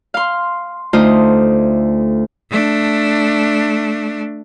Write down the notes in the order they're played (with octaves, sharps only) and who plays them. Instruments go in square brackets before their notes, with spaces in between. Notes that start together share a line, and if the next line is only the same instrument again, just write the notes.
[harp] F5 C6
D2 A3 D#4 F4 C5 D#6
[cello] A3 D4